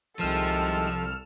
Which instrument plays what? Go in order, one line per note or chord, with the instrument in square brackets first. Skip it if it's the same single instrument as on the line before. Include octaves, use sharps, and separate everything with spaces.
[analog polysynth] C2 F6 E7 [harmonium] C3 D#3 G#3 [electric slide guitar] F3 [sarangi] A4